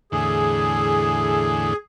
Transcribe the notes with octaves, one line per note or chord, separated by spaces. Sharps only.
E2 A2 D3 G#4